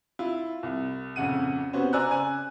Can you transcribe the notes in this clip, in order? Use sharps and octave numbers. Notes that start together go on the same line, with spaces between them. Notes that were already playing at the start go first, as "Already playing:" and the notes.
E4 F4
C2
A#1 F2 C#3 F#5 D#7
C3 B3 C#4 F#4 C5
C5 D5 G#5 A#5 E6 F#6
C#3 G#5